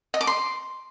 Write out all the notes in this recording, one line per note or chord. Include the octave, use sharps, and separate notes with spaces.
D#5
D6
C6